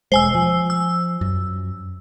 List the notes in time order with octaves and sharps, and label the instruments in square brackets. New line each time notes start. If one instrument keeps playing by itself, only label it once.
[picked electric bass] E1 G#3 [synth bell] C5 G#5 E6
[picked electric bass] F3
[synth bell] E6
[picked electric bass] F#2